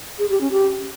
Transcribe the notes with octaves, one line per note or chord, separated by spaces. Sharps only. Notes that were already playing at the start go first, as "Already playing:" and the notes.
G#4
G4
C#4
G4